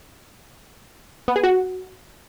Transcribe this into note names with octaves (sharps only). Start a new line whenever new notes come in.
B3
G#4
F#4